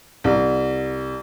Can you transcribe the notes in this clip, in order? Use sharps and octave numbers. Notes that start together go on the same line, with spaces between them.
C2